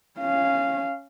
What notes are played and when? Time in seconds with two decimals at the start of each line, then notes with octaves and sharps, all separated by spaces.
0.20 C#4 F5